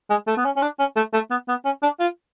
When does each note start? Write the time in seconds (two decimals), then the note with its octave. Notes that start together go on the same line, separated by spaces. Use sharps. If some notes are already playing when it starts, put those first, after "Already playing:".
0.10 G#3
0.27 A3
0.37 B3
0.45 C#4
0.56 C#4
0.62 D4
0.79 C#4
0.96 A3
1.13 A3
1.30 B3
1.48 B3
1.65 C#4
1.83 D4
2.00 F4